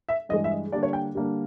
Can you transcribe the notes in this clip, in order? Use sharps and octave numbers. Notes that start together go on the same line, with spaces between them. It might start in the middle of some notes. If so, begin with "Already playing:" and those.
E5
G2 E3 G#3 D#5
E5
D#5
D3 G3 A#3 D4 D5
C#5
G5
D3 G3 A#3 D4